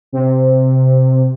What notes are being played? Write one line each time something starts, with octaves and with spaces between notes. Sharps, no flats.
C3